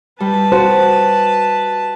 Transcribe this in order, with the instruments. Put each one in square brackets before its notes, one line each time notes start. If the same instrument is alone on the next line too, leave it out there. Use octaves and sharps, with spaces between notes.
[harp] G3 [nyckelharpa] B4 A5
[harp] F#4 [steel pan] C5